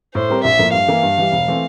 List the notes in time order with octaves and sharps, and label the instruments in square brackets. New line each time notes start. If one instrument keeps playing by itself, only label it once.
[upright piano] A2 [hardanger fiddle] C5
[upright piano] G3 C4 G4 A#4
[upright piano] A#1 [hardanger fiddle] E5
[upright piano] A2 F3 A#3
[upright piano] G2 [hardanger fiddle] F5
[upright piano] E3 A#3
G2
E3 G3
E1
E3 A3 C4